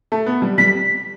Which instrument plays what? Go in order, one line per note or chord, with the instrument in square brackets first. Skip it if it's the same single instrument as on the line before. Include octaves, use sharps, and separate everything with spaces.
[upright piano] A3
B3
G3
[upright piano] G3 [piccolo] B6